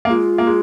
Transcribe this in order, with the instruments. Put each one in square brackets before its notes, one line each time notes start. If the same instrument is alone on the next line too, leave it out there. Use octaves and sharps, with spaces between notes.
[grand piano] A#3
[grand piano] G#3 [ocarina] F4
[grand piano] A#3
G#3